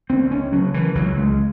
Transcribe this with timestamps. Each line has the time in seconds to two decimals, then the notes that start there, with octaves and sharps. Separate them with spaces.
0.10 C#2 C4
0.31 C#4
0.52 C#3 F#3
0.74 E3
0.95 C#2 F#3
1.17 G#3